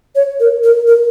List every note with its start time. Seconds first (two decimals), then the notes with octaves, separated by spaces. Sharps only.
0.15 C#5
0.40 A#4
0.64 A#4
0.87 A#4